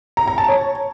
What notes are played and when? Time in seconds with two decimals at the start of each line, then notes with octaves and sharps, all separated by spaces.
0.17 A#5
0.27 A#5
0.38 A5
0.48 C#5